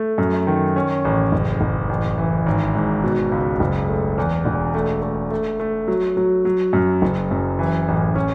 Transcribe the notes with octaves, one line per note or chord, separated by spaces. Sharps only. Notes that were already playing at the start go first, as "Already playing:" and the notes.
Already playing: A3
F#2
D#3
C#4
A1
F#1
F#1
A1
E3
G#1
G#2
B2
C#2
F#1
A3
E2
E1
A3
A3
A3
A3
F#3
F#3
F#3
F#2
F#1
F#2
E3
A1
C#4